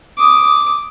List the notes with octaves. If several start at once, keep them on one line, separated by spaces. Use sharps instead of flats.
D6 D#6